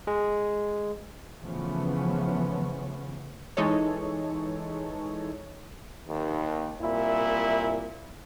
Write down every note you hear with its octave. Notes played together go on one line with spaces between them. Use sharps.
G#3
C#3 E3 F3 A3 B3 C#4
E3 G#3 D#4 A4 C#5
D#2
C2 A#2 E4